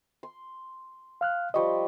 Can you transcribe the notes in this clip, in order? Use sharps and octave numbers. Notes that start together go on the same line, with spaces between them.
C6
F5 F6 F#6
F3 G3 D#5 C6 C#6